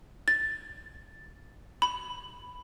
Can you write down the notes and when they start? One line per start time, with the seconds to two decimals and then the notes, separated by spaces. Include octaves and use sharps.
0.28 A6
1.82 B5